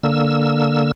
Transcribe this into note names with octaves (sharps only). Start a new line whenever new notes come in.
D3 A#3 E6